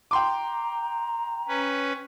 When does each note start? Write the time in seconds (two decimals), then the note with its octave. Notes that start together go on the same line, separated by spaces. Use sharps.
0.11 G5 A#5 C6 D6
1.48 C#4 B4